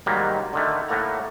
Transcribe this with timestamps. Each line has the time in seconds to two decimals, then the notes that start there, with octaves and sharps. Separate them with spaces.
0.06 G#2 D#3 F#3 G3 A#3
0.53 D3 D#3 A3
0.88 A2 A3 A#3 F#5 A#5